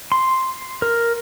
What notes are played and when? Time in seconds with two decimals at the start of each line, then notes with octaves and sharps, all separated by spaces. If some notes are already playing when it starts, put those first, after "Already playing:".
0.12 C6
0.82 A#4